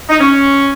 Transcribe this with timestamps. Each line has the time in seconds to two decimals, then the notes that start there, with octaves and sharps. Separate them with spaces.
0.10 D#4
0.20 C#4